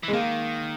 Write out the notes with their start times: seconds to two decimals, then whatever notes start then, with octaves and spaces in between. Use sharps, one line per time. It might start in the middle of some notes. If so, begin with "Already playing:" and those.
0.03 E3
0.08 G#3
0.13 D#3 A#3